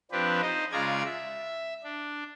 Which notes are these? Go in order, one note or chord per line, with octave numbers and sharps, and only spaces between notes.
F3 C4 D4 G4 B4
D#4 C5 D#5
C#3 G#3 F4 D5 A#5 G#6
E5
D4